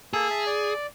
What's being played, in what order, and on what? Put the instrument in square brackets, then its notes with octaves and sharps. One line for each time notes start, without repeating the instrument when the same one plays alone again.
[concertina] A#3 A4 E6 [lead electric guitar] G#4
[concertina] E5 A5
D5